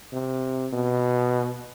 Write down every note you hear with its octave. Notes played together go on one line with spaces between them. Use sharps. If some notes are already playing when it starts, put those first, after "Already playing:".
C3
B2